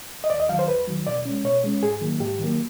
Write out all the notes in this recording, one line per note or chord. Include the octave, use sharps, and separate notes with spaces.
D#5
D#2 D5
D#5
D#3 F#3 F5
C5
D#2 B4
D#3 F#3
B2 D5
G#3 C#4
B2 C#5
G#3 C#4
G#2 G#4
D#3 F#3 A#3
G#2 G4
D#3 F#3 A#3